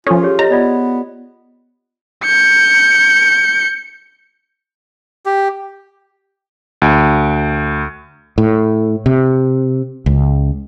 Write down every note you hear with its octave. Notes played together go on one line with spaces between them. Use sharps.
F3 C#4 F4 A4
G4 G#4 C#5
G4 C#5 D#5 A#5
B3 F4 D5 D#5
G6 C#7
G4
D2
A2
C3
C#2